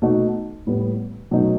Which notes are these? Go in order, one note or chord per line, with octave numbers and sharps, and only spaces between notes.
B2 A3 D#4 F#4
A2 G3 B3
B2 F#3 A3 D#4